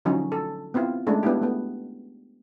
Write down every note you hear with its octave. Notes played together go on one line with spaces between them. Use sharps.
D3 F3 F#3 C#4 D#4
A4
B3 C4 E4 F4
G#3 A3 C#4 D4
B3 D4 E4 F4 G4
A3 B3